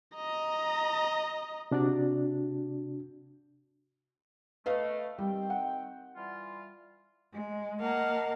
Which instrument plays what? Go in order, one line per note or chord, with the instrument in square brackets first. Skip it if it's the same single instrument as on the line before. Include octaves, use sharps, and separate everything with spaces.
[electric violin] D#5 A#5
[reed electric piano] C3 D4 F#4 D5
[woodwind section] A3 [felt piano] B4 D#5 F5
[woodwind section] D#3 C4 G5 [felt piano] G3
[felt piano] F#5
[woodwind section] E3 G3 F4
[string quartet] G#3
A#3 A#4 D#5 F5 F#5 A5